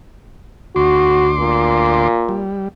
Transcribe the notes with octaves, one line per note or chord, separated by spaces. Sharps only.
D2 F#4 C6 D6
A#2
G3